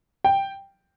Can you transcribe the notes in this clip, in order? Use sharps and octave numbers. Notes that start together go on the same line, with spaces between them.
G5